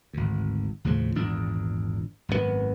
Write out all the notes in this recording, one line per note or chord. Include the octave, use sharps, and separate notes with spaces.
G#1 D2
D#2 A2 C#3 F3
G#1 E2 A#2 D4
G#1 F#2 A2 B3